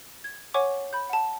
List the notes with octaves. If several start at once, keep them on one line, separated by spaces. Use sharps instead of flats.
G#6
C#5 F#5 G#5 C#6 D6
B5 G6
F#5 A5